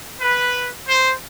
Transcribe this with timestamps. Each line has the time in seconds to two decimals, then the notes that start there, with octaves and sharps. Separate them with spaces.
0.21 B4
0.88 C5